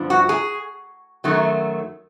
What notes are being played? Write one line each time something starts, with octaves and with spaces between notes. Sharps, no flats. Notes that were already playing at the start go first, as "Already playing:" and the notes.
Already playing: G2 D3 F3
F#4
G#4
F#2 D#3 F#3 A3